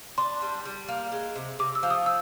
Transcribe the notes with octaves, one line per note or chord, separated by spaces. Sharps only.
D4 C6
G3
G3
A#3
G#3
C3
C3 D6
E6
F3
D#6
E6